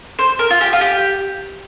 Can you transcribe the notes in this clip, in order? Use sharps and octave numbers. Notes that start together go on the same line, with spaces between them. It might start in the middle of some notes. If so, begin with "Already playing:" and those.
C5
A#4
F4
G4
F4
G4